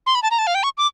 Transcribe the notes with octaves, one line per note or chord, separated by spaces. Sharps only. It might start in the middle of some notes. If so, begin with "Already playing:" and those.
C6
B5
A5
A#5
A5
F5
G5
C#6
D6